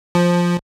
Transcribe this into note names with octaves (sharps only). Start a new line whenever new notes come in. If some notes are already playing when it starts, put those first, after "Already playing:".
F3